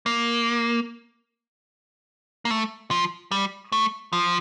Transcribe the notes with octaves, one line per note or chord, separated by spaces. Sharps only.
A#3
A#3
A3
F3
G3
A3
F3